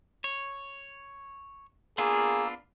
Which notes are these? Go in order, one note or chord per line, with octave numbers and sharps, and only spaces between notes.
C#5
A#3 B3 D4 F4 G#4 E6